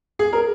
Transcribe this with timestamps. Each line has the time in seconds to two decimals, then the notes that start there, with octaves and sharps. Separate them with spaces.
0.19 G#4
0.33 A#4